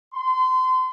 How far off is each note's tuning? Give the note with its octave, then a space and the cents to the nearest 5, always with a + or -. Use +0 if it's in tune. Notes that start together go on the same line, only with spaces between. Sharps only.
C6 -30